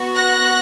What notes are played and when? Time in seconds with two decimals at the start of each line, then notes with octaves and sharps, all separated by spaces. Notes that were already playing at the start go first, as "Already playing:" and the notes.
Already playing: B3 F#4
0.15 F#6 A#6